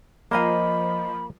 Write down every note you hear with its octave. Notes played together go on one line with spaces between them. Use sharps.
F3 A#3 C5 D#5 F5 G#5 A#5 B5